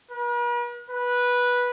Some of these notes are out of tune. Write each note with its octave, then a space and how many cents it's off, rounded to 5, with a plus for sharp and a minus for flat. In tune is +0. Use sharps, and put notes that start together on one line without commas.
B4 -45
B4 -10